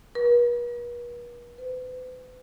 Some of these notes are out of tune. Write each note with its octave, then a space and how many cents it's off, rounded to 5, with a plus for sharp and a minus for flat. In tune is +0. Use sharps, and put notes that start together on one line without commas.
B4 -45
B4 +45